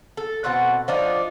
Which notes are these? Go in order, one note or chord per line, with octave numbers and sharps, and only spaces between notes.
A4
B2 C4 F#5 A5
F3 D4 D#4